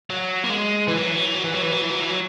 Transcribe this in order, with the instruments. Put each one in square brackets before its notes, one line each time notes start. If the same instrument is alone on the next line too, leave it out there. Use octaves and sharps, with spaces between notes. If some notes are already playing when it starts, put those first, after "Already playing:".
[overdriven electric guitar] F#3
A#3
G#3
E3
F#3
E3
F#3
E3
F#3
E3
F#3
E3
F#3
E3
F#3
E3
F#3